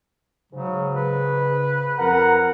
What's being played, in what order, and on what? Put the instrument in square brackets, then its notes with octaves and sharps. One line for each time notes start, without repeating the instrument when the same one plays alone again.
[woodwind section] G#2 C#3 [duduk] F#3
[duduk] B4
[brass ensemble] F2 A#4 F#5 [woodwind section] A#5